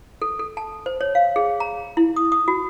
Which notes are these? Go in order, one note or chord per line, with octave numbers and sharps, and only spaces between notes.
A4
A4
A5
C5
C#5
F5
G#4
A#5
E4
D#6
D#6
F#4